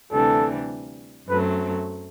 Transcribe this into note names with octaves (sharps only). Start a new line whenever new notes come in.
D2 C3 E3 G3 D4 A4
F#2 F#3 A3 C4 B4